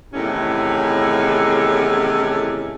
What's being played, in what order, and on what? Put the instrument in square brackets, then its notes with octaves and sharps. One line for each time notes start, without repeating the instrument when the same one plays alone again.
[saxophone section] E2 A2 C3 D#3 C#4